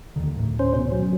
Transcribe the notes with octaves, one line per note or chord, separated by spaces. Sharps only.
D#2 D3 D#3
D2 A2 D#3
C#4 C5
B2
F#3